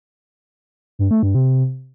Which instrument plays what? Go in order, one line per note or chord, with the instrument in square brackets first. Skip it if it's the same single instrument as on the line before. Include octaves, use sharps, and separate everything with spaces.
[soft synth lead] G2
A3
G2
C3